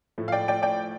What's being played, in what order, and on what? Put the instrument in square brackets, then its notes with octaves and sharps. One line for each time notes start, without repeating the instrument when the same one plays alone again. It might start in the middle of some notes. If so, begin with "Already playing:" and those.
[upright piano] A2 F3 A3
F5
D5 G5
D5 G5
D5 G5